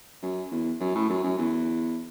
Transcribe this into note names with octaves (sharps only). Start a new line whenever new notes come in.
F#2
E2
F#2
A2
F#2
F#2
E2